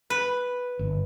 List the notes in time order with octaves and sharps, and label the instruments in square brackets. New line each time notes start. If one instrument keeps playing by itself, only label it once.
[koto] B4
[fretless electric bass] G1